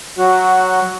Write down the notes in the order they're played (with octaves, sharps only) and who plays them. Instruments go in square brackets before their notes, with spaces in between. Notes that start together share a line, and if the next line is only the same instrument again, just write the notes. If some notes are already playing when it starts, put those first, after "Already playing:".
[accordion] F#3 F#4